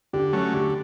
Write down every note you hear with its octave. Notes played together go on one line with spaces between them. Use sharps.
D3 G4
F#3 A3 C#4
D3 G4